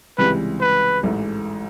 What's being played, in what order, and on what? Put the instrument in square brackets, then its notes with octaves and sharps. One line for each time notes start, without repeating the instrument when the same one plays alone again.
[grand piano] C#2 C3 E3 G3 [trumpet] B4
[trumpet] B4
[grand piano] A1 G#2 E3 A3